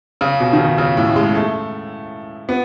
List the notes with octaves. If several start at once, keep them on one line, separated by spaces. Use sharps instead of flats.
C#3
B2
D#3
C#3
C#3
A2
G#3
A3
B3